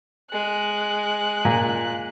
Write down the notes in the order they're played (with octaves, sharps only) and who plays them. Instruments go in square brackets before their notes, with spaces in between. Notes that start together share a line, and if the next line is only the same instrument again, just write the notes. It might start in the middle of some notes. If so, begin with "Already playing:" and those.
[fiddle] G#3 F#6
[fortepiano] A#2